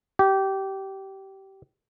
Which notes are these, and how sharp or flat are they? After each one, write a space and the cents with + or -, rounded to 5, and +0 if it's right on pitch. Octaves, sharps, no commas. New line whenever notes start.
G4 -20